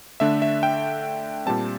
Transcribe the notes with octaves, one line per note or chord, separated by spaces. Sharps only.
D3 A3 D4 E5
E5
G5
A#2 G3 C4 A5